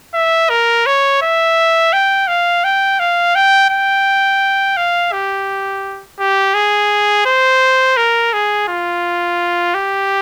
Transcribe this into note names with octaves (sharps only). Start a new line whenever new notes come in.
E5
A#4
C#5
E5
G5
F5
G5
F5
G5
G5
F5
G4
G4
G#4
C5
A#4
G#4
F4
G4